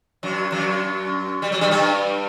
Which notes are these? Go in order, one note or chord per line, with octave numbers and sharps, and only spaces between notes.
F#2 F#3
F#2 F#3
G3
F#3
G2 G3
G2 G3